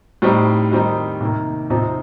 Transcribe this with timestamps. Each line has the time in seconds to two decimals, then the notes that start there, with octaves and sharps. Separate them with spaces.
0.22 A2 G3 C4 D#4
0.72 D#3 G3 C4 D#4
1.21 C3 D#3 A#3
1.70 C3 F3 C4 D#4